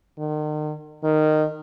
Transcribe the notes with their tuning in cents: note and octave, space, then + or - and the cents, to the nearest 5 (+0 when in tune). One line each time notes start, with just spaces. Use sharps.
D#3 -40
D#3 -15